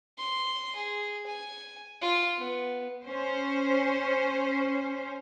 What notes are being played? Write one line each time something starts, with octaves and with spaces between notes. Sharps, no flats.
C6
G#4
G#5
F4
B3
C#4 C5